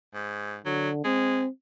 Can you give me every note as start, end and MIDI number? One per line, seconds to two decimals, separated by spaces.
0.15 0.56 44
0.66 1.02 50
0.66 0.89 54
1.05 1.43 56
1.05 1.49 60